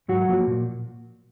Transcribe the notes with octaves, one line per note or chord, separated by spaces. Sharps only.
G#2 F#3 F#4
F3 A#3
A#2